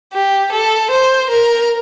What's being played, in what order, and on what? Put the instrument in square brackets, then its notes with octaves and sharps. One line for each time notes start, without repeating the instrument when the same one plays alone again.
[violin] G4
A4
C5
A#4